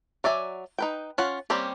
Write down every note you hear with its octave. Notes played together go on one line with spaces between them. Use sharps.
F#3 D5 E5 G#5
D#4 B4 G5
C#4 F4 F#5
G3 A#3 C4 C#4 G4